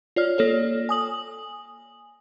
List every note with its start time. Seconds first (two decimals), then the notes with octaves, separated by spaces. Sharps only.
0.16 F4 C#5 D5 F6
0.38 A#3 A4 C#5
0.89 G#5 D#6 F#7